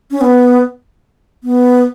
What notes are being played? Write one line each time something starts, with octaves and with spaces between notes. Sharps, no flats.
C#4
B3
B3